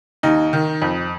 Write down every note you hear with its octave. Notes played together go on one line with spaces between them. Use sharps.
D#2 D#4
D#3
F2